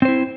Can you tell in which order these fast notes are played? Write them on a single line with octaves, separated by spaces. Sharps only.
C4 C5 E4